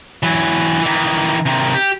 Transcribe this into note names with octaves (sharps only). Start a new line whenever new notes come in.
E3 F#3
D#3 E3
C3 D#3
G4